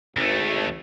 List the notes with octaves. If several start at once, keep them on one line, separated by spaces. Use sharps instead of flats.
G#1 D2 A3